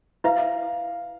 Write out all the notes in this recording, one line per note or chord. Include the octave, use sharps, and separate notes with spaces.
E4 B4 E5 F5